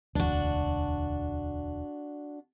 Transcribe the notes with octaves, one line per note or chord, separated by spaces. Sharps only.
E1 D2 D4 F#4